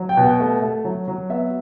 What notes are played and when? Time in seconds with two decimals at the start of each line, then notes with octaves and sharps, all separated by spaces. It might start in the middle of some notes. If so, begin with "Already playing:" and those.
Already playing: F#3
0.09 G5
0.17 B2
0.24 F#5
0.40 A3
0.62 A3
0.85 F#3
1.08 F#3
1.29 B3 E5